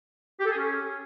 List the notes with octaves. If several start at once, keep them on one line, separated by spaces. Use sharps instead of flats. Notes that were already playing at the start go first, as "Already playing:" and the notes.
G4
A4
G#4
C#4